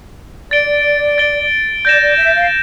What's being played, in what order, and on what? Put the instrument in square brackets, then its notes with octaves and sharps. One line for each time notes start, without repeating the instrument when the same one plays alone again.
[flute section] D5 [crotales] A6 D7 G7
[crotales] A6 D7 G7
[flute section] D5 [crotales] G6 A#6 E7
[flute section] D5
E5
F5